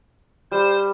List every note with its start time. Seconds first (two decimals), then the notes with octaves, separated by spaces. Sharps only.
0.52 G3 C5